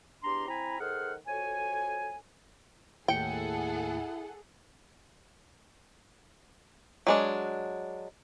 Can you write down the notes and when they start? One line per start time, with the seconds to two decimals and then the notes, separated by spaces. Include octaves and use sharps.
0.24 E2 D4 G4 A#5 C6
0.48 C4 E4 G#5 A#5 B5
0.80 D#3 G#4 A4 C5 F#5 F6
1.27 F2 F#4 A4 C#5 G#5
3.08 D#2 A2 E4 G#4 A4 F#5 G5 C#7
7.07 F#3 G#3 D4